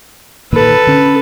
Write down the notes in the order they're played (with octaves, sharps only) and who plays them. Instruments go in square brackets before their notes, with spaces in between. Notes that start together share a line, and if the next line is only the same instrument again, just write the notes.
[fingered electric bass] A#2 D#3 A#3 [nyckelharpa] A4 B4
[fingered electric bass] D3 C#4